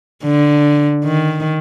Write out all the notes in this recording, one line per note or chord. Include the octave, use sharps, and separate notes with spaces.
D3
D#3